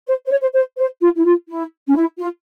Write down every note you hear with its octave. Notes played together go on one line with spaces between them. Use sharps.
C5
C5
C#5
C5
C5
C5
F4
E4
F4
E4
C#4
E4
F4